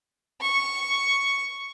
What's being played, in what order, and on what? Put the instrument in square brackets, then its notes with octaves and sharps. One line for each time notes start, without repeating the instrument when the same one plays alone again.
[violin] C#6